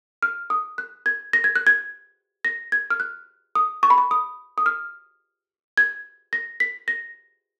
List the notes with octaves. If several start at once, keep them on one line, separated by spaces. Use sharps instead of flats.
F6
D#6
F#6
G#6
A#6
G#6
F#6
G#6
A#6
G#6
F6
F#6
D#6
C#6
B5
C#6
D#6
D#6
F6
G#6
A#6
B6
A#6